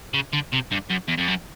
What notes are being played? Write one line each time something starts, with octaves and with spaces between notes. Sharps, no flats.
C#3
D3
C3
G2
F#2
E2
F2
F#2